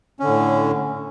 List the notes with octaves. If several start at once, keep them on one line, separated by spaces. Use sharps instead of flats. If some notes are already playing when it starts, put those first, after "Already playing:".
A2 D3 C#4